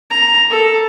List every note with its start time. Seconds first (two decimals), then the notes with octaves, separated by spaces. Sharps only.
0.11 A#5
0.50 A4